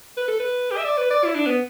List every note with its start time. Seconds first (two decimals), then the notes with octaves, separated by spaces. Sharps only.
0.17 B4
0.28 A4
0.40 B4
0.71 G4
0.78 E5
0.85 D5
0.98 B4
1.11 D5
1.25 E4
1.35 D4
1.47 B3